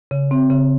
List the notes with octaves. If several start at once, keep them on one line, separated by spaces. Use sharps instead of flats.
C#3
C4
C#3